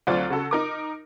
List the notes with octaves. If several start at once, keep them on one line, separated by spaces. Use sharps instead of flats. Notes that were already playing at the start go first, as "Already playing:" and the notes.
D2 F#3 C4 F4 D5
C#3 F#4 A4
D#4 A#4 D6